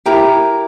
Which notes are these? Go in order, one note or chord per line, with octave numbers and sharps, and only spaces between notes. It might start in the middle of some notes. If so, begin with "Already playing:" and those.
E4 G4 A#4 A#5